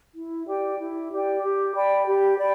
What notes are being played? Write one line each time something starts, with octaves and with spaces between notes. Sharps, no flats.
E4
G4 D5 G5
E4
G4 D5 G5
G4
D5 G5 B5
G4
D5 G5 B5